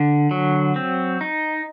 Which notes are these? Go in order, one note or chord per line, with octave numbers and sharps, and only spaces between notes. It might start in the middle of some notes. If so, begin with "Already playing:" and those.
Already playing: D3
F#3
C4
D#4